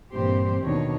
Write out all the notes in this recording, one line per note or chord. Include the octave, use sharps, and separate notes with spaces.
G2 A#2 E3 C4 G4 C5
D#2 B2 D#3 D4 D#4 C#5